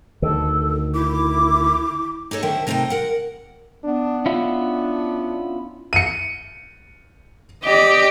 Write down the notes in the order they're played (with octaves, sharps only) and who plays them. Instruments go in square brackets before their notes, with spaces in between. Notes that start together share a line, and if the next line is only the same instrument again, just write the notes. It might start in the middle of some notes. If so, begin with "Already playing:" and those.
[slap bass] D2 D#3 [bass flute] A4
[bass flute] E4 [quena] D6
[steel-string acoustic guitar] D#4 G#4 A4 C#5
D3 D#3 A3 C5 E5 G5
C3 A3 D#4 C5 G5
A#4 F#5
[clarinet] B3 [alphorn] D4
[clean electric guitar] C#4 E4 F4 [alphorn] D4
[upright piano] C#7 D#7
[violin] G4 [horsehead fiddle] D5 D#5